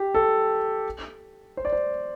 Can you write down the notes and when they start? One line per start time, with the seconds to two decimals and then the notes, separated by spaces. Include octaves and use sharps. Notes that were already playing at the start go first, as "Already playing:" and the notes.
Already playing: G4
0.15 A4
1.57 C5
1.65 D5
1.72 C5